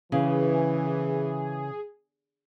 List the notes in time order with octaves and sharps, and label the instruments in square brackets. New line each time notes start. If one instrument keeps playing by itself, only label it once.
[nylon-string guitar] C#3 [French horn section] E3 [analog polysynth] G#4